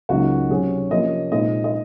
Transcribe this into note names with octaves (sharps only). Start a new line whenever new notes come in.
C#2 C#3 F#3 A#3 D#4 F#4
C3 F#3 C#4 G#4
C3 F3 A#3 C#4 D#5
A#2 G#3 C4 D#4 D#5
D#5